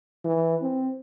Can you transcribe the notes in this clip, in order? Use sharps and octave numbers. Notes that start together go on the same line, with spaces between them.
E3
C4